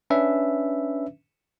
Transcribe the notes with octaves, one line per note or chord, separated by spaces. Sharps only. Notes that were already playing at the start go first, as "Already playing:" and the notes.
C#4 D4 B4 E5